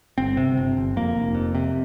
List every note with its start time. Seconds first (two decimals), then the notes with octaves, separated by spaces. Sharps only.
0.18 G1 C4
0.37 C3
0.57 G1
0.77 G1
0.96 F2 A#3
1.15 F1
1.35 F2
1.55 C3